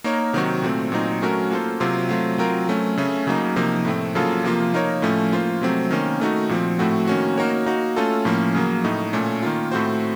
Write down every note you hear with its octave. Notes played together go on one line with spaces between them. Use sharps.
A#3 D#4 A#4 C#5
C3 D#3 F#3 C4 F#4
A#2 A3 C4
A#2 F#3 C4 D#4
F#3 A3 C#4 F#4 A#4
A#3 F4 A4 C5
C3 F#3 C4 F4
F#3 A3 C4 F4
F#3 C4 F4 A#4
F#3 A3 C#4
C#3 A3 C#4
C#3 F#3 A#3 D#4
C3 F3 A#3 D#4
A2 A3 C4
C#3 F#3 A#3 F4 A4
C3 F3 A#3 F4
A#3 D#4 A#4 C#5
A2 F3 A3 C#4
A#3 F4 C5
C3 F#3 A3 C4
D#3 A#3 C#4
D#3 A3 D#4 F#4
A#2 F3 C4
A2 A3 C4 F#4
D#3 A#3 C#4 F#4
A#3 D#4 F#4 A#4 C#5
A#3 D#4 F#4
A3 C#4 F4 A4
A2 F3 A#3 C#4
C#3 F#3 A#3
A2 A3 D#4
A#2 A3 C#4
D#3 A#3 F4
A2 A3 C4 F#4 C5